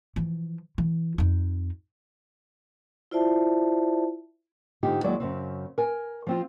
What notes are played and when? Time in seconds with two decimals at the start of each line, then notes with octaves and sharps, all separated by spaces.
0.16 E3 F3
0.78 E3
1.18 F2 D#4
3.11 E4 F4 C5 D5 E5 A5
4.83 G#2 D3 D#4 F4 G4
5.04 D#2 F#3 G#3 E4 D5
5.20 F#2 C#3 C4
5.78 A#4 G#5
6.27 F3 C4 F4